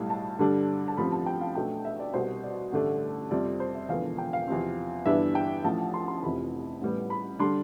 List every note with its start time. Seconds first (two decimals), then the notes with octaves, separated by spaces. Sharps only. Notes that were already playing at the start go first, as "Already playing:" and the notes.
Already playing: B1 A2 G3 F5
0.10 A5
0.39 G2 D3 G3 D4
0.88 A5
0.97 A1 G2 F3 C4 B5
1.12 A5
1.26 G5
1.41 F5
1.55 B1 B2 A3 D4 G5
1.85 E5
2.00 D5
2.14 C2 B2 G3 C5
2.44 D5
2.72 A1 G2 D3 A3 D4
3.31 F2 C3 G3 C4 D5
3.60 C5
3.75 E5
3.89 E1 E2 D3 F3 B3 F5
4.18 G5
4.33 F5
4.47 E2 C3 F3 C4
5.06 G1 G2 E3 B3 D4 E5
5.35 G5
5.64 A1 A2 F3 A5
5.94 C6
6.08 C6
6.22 F1 F2 C3 E3 B5
6.81 A1 A2 G3 B3
7.10 B5
7.39 D3 G3 D4 C6